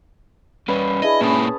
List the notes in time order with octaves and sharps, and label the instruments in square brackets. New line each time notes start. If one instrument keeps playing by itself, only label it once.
[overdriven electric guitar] G3 C#4 [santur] B4
[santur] D4 E4 G#4 [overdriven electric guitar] D#5
[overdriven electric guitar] A#2 E4 [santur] C#4 A5 D#6